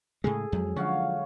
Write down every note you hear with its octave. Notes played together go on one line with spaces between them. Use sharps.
A2 C#3 G#3 G#4 A4
F2 F#3 G#3
D3 F3 C#4 F#4 F5